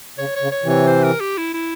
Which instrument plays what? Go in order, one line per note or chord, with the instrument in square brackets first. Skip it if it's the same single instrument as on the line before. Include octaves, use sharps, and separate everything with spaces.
[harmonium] C#3 [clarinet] C#5
[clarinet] C#5
[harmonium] C#3
[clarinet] C#5
[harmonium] C3 E3
[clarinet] C#5
C5
A#4
G4
E4
E4